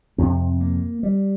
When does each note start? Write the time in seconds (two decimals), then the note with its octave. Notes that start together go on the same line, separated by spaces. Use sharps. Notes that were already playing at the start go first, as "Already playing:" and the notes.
0.18 F2 C3 C4
0.60 A#3
1.03 G3